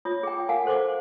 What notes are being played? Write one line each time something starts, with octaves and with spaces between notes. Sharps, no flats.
F4 C#5 D#6
G#4 G5
A#4 F5 F#5 G#5
A4 C5 C#6 D6